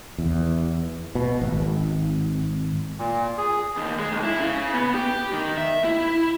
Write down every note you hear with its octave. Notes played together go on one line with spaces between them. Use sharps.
E2
B2
G#1
A#2
G#4
D#2
G#3
B1
E4
C#3
B3
G4
D#3
E5
E4